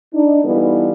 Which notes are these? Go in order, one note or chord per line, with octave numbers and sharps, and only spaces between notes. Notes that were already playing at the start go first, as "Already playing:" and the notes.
D4 D#4
E3 G3 B3 D#4 F4 A4